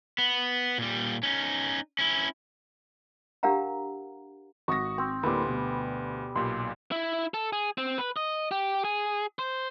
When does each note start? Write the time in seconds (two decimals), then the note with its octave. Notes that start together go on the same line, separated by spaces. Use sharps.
0.18 B3
0.78 A#2 G3
1.23 C#4 D#4
1.99 C#4 E4
3.43 D4 G4 A#4 F5 F#5 A#5
4.68 G#1 F#4 C#6 D#6 A#6
4.98 C4
5.23 D2 A2 G3 A#3 B4
5.48 B2
6.35 B1 A#2 G4 C6
6.92 E4
7.34 A4
7.53 G#4
7.78 C4
7.98 B4
8.17 D#5
8.51 G4
8.85 G#4
9.39 C5